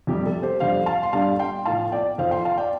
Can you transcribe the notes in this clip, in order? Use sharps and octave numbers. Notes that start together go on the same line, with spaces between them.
F2 C3 G3 G4
A4
G4 C5
F2 D3 G3 C5 F5
F5 A5
C6
G2 D3 G3 F5 A5
G5 C6
A2 F3 F5 A5
D5 G5
F2 F3 C5 F5
G5 C6
F5 A5
D5 G5